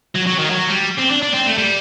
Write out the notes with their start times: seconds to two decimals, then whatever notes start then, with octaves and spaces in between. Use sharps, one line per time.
0.15 F#3
0.27 F#3
0.39 D#3
0.51 F#3
0.69 G3
0.98 C4
1.10 D4
1.22 D4
1.34 C4
1.46 A3
1.58 G3